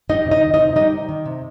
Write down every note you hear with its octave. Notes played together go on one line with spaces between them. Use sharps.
G3 D#4 D#5
C3
D#4 D#5
D#3
D#4 D#5
C3
G3 D#4 D#5
C3
D#3
C3